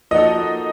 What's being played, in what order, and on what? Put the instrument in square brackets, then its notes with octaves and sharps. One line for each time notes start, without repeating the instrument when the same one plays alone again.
[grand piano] F3 A#3 D#4 F#4 A4 [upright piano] D#5